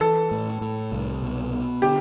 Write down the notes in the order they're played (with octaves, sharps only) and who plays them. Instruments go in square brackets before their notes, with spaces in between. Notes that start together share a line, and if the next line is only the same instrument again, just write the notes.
[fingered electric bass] E3 [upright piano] A4
[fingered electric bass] A2
A2
C2
B2
B3
[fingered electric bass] D3 [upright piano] G4